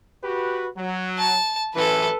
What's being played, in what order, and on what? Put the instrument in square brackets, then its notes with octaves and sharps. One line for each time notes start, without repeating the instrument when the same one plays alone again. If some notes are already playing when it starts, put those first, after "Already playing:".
[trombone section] F#4 G4 B4
F#3
[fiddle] A5
[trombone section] A1 F#2 E3 [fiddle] A4 B4